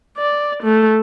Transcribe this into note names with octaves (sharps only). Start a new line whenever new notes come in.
D5
A3